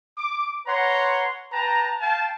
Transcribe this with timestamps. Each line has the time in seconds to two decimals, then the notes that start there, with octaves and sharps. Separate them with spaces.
0.18 D6
0.67 B4 C#5 F#5 A#5 C6
1.53 B4 G5 A5 A#5
2.01 F5 G5 A5